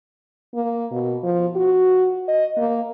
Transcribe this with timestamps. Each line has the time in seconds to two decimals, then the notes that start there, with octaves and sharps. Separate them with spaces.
0.55 A#3
0.91 B2
1.23 F3
1.56 F#4
2.28 D#5
2.57 A#3